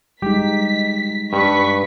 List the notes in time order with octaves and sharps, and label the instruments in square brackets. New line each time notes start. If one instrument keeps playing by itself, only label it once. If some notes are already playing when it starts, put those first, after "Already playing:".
[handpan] G3 G#3 D#4 [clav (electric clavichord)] G4 [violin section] B6
[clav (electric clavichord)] G2 [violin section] B4 C#6 B6